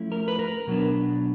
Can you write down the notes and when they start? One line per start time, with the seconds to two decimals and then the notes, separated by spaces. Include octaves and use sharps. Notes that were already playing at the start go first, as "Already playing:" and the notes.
Already playing: F3 A3 C#4 E4
0.12 A#4
0.28 B4
0.39 A#4
0.67 B2 F#3 B3 D4